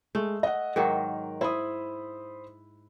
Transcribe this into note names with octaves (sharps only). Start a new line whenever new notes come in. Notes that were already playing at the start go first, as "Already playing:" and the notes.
G#3 A3
D#5 F#5
G#2 D#3 F#3 A#4
E4 C5 B5 D#6